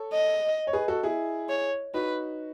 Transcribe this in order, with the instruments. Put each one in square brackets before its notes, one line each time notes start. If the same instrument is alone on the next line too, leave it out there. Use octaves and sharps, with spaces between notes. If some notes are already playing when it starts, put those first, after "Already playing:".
Already playing: [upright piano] A4 C#5
[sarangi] D#5
[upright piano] C#5
G#4 B4
F#4 A4
E4 G#4
[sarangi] C#5
[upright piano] D#4 F#4 [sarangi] B4